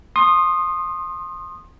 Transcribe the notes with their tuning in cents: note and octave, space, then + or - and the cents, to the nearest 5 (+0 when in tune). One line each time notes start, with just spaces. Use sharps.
C6 +25 D#6 -15